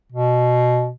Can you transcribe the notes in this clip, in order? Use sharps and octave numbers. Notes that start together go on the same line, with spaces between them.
B2